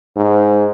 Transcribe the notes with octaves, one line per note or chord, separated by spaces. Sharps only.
G#2